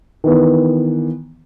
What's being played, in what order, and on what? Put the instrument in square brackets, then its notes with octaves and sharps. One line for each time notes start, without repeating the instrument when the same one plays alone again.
[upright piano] D#3 E3 B3